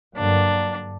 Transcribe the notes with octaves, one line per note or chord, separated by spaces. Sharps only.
G2 D3 F#3 A#3 D4